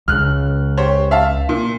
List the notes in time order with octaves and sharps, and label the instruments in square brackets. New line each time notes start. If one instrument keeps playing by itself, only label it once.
[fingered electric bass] C#2 C#3 [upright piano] F6 F#6
[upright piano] G4 C5 C#5
E5 F5 A5
A#2